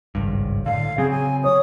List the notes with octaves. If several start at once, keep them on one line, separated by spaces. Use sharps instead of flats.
G#1 C#2 G2
A2 D3 F5
C#3 F#3 C4 G#4
G#5
C#5 D#6